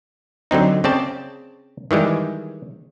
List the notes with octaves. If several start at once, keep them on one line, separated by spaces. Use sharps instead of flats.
D3 F#3 C4 D#4
C#3 C4 D5 A5
D#3 E3 G3 G#3